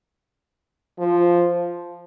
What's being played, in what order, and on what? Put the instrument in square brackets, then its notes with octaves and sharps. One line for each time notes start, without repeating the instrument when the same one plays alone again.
[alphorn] F3